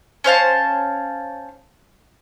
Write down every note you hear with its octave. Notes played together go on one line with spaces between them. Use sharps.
C#4 C5 F5 A5